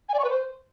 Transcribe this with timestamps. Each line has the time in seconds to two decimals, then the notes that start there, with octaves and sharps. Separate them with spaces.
0.09 G#5
0.14 D5
0.19 C#6
0.24 B4
0.29 C5